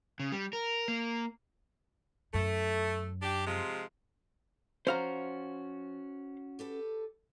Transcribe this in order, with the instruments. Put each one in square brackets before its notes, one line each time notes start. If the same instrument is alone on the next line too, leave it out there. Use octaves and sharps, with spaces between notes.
[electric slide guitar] C#3
G3
A#4
A#3
[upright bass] F#2 [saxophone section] A3
[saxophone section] D4 G4
C3 F3 G#3
[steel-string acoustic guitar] F3 [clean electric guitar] C#4 F#4 [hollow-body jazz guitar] C5 F5 A#5
[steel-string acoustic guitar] G4 A4 B4